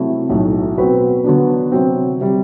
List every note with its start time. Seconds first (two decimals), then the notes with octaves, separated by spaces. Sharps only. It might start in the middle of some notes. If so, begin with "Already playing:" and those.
Already playing: C3 F#3 A3 E4
0.29 B1 A2 F#3 A3
0.78 B2 F#3 C4 F#4 B4
1.24 D3 F#3 B3 D4
1.72 C3 F#3 C4
2.21 C3 G3